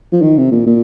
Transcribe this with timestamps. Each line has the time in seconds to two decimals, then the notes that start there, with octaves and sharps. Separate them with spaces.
0.12 F3
0.22 D#3
0.37 C3
0.51 A#2
0.66 A#2